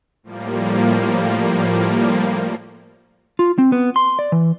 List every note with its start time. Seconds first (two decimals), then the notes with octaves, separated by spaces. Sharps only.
0.23 A2 F3 G3 A#3
3.39 F4
3.58 C4
3.72 B3
3.96 C6
4.19 D5
4.32 E3